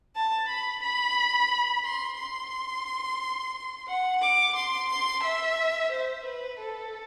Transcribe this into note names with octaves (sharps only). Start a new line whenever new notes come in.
A5
B5
B5
C6
C6
F#5
D6
C6
C6
E5
C5
B4
A4